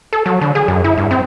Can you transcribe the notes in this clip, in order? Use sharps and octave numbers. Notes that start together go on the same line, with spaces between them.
A4
F#3
D3
G#4
F#2
E4
G2
C4